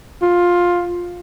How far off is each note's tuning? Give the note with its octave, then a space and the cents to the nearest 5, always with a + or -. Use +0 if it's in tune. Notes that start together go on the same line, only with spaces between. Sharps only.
F4 +10